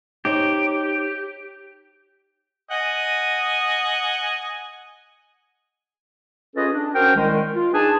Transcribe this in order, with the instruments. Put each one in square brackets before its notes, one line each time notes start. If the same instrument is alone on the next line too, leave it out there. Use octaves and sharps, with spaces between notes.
[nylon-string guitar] D#4 C5 C#5 [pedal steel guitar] G4
[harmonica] D#5 F#5 G#5
[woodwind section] C#4 F4 G#4 A4 B4 D#5
D4
C#4 F#4 A#4 C5 G5
C2 D#3 G#3
F4
D4 D#4 G#4 B4 G#5 A5